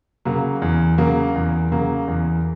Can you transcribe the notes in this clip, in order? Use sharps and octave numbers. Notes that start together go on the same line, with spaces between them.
C#3 F#3 A#3
E2
C#3 F#3 A#3
E2
C#3 F#3 A#3
E2